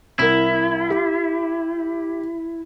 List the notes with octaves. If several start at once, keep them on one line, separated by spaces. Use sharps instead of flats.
C2 E4 A#4
G4